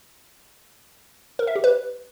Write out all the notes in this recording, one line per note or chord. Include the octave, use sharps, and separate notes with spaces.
A#4
E5
G4
B4